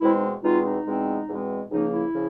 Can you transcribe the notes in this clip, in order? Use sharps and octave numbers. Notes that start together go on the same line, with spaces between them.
E2 B2 G#3 C4 E4
D#4
E2 B2 G#3 C4 D#4 F4
D#4
E2 B2 G#3 C4
E2 B2 G#3 C4
C#2 C#3 F3 A#3 D#4
E4
C#3 F3